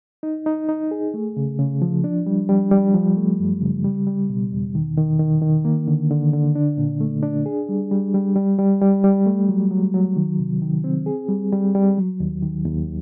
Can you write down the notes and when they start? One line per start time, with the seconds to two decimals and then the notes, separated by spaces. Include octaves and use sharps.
0.23 D#4
0.46 D#4
0.69 D#4
0.91 G#4
1.14 A3
1.37 C#3
1.59 C#3
1.82 F3
2.04 D4
2.26 G3
2.49 G3
2.71 G3
2.94 F3
3.17 A3
3.40 F#2
3.61 C#3
3.85 G3
4.07 G3
4.29 B2
4.52 E2
4.75 D#3
4.97 D#3
5.19 D#3
5.42 D#3
5.65 A#3
5.88 D3
6.11 D3
6.33 D3
6.55 D4
6.78 A#2
7.01 A3
7.23 D4
7.46 G#4
7.69 G3
7.91 G3
8.14 G3
8.36 G3
8.59 G3
8.82 G3
9.04 G3
9.26 A3
9.49 F#3
9.71 F#3
9.94 F#3
10.16 D#3
10.39 C3
10.62 D#3
10.84 C4
11.06 G#4
11.29 G3
11.52 G3
11.75 G3
11.97 F#3
12.20 D#2
12.42 D#3
12.65 D#2